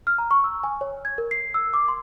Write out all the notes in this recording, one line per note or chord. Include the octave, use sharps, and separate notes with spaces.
F6
A#5
C#6
E6
G#5
C#5
G#6
A#4
C7
E6
D6
C6